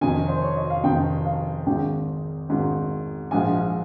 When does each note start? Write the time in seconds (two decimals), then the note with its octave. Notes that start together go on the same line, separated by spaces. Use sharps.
0.01 F1 F2 D#3 G#5
0.28 C5
0.42 C#5
0.56 D#5
0.70 F5
0.84 F1 F2 D#3 G5
1.25 F5
1.66 G#1 G#2 D#3 G5
2.49 G#1 G#2 D#3
3.31 A#1 G#2 F3 G#5